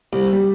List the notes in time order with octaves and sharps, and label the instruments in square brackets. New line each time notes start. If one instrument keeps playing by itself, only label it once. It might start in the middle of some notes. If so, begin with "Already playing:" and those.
[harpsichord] C2 [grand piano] G3
[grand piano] G3